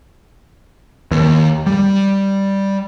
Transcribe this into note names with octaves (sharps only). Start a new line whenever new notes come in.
D#2
G3